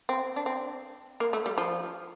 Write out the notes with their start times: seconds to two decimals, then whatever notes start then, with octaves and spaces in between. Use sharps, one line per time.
0.09 C4
0.36 D4
0.46 C4
1.20 A#3
1.33 A3
1.46 G3
1.58 F3